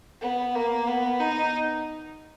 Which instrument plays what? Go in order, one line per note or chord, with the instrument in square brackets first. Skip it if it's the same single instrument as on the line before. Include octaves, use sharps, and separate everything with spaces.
[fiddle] B3
A#3
B3
D#4